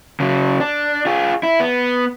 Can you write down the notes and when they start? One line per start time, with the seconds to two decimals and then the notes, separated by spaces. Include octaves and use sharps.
0.20 C#3 F#3
0.60 D4
1.06 F4 G#4
1.43 E4
1.60 B3